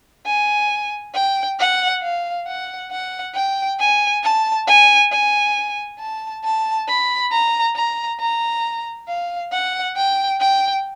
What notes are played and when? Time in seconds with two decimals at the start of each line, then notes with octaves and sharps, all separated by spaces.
0.26 G#5
1.14 G5
1.59 F#5
2.03 F5
2.47 F#5
2.91 F#5
3.34 G5
3.79 G#5
4.24 A5
4.67 G#5
5.12 G#5
5.99 A5
6.44 A5
6.88 B5
7.31 A#5
7.75 A#5
8.20 A#5
9.08 F5
9.52 F#5
9.97 G5
10.40 G5